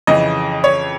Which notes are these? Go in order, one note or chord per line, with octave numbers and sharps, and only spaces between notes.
F2 C#3 E3 D#5
C#5